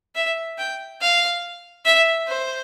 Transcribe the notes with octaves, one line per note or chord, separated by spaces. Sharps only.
E5
G5
F5
E5
C5